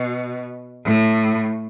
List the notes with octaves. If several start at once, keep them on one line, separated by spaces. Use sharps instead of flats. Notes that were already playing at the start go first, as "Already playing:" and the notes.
Already playing: B2
A2